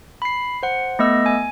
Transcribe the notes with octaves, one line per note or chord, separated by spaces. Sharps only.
B5 C7
C5 F#5
A3 B3 D#5 E6
G#5